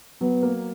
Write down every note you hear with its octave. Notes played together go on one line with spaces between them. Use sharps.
F#3 B3
A#3